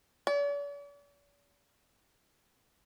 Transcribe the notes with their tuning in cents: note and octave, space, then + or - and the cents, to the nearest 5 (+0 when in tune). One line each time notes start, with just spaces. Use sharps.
D5 -45